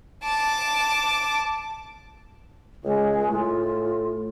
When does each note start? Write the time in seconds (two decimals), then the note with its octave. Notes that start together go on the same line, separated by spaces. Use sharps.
0.23 A5 D6
2.84 C#2 G#3
3.31 A2 F4